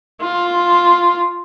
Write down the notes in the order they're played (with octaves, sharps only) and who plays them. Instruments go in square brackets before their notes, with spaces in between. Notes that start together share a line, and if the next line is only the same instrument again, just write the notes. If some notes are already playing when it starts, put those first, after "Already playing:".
[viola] F4